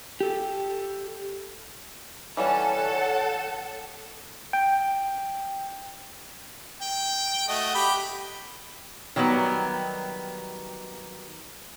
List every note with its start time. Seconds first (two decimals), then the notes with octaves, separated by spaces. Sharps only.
0.20 G4 A4
2.37 E3 G3 C#4 A4 C#5 F#5
4.53 G5
6.81 G5
7.48 A3 F#4 D#5
7.75 G4 B5
9.16 D#3 F#3 G3 B3